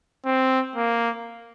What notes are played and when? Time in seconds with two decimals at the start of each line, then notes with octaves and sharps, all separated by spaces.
0.25 C4
0.75 A#3